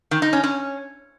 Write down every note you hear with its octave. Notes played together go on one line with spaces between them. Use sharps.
D#3
D#4
C#4
C#4